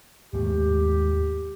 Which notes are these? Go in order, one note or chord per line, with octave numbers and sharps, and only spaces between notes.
D#2 G#2 A3 G4